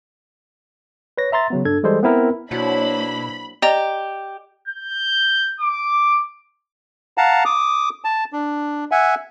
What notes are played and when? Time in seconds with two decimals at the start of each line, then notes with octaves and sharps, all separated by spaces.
1.18 B4 C#5 A#6
1.32 E5 A#5 C6 A6
1.50 C#3 F#3 B3
1.65 G2 D4 A4 G#6
1.83 E3 G3 G#3 A4 C5
2.03 B3 C4 E4 A#4 B4
2.51 B2 F#3 A#3 D4 E4 C5 C#5 B5
3.62 G4 D5 D#5 A#5
4.68 G6
5.60 D6
7.17 F5 F#5 A5 A#5
7.45 D6 D#6
8.05 A5
8.33 D4
8.91 E5 F#5 G#5